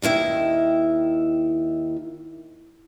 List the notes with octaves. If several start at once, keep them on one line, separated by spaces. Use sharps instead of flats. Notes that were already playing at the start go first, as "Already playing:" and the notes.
D#2 D#3 E4 E5